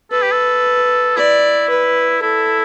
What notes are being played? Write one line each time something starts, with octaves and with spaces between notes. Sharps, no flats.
A4 B4
G4
A4
E4 D5
B4
E4 A4